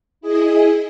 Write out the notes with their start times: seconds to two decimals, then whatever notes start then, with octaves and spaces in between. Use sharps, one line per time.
0.21 E4 G#4 D#5